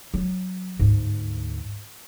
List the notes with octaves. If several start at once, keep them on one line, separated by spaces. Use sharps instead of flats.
F#3
D2 G#2